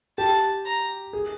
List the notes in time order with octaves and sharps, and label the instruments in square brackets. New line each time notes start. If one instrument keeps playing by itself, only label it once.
[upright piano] G4 [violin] A5
[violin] A#5
[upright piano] G#4